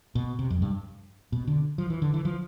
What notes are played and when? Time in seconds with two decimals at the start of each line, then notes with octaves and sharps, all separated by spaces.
0.15 B2
0.39 C3
0.50 F2
0.62 G2
1.32 B2
1.47 D3
1.78 F3
1.90 E3
2.02 D3
2.14 E3
2.25 F3